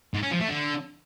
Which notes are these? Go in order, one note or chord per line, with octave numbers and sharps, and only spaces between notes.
G#2
C#4
F3
A3
D3